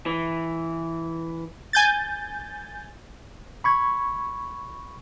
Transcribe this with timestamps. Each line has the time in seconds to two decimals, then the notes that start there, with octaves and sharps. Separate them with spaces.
0.06 E3
1.73 G#5 G6 A6
3.64 B5 C#6 G#6